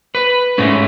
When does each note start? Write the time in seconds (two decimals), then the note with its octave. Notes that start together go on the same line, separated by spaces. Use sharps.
0.15 B4
0.58 G#2 G#3 A3 C#4